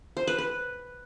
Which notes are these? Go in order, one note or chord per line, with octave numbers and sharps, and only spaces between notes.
C5
B4
B4